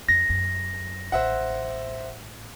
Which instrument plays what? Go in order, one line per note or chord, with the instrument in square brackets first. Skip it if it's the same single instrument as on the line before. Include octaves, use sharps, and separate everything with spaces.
[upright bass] F2 [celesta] A#6
[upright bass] F#2
[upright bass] A1 [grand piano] C5 E5 F#5